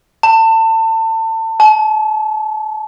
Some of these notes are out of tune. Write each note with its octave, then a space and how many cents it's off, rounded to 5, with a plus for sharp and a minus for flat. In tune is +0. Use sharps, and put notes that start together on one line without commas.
A5 +30
A5 -40